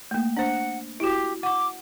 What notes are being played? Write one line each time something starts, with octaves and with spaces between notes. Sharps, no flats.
A3 A#3
D4 C5 F#5
E4 F#4 G4
F#5 C#6 D6